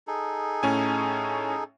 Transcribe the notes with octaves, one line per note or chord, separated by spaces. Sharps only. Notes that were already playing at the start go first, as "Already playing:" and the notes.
D#4 G#4 A4
A2 C#4 G#5